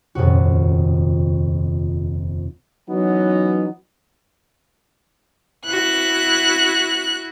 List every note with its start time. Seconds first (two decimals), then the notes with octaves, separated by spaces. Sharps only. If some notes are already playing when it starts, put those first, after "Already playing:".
0.15 D#1 F2 C3 F#4
2.89 E3 F#3 B3 C#4 D#4
5.66 E4 F#4 F#6